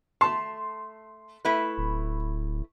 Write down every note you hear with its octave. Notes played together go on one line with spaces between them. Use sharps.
A3 A5 C6
A3 E4 B4
D1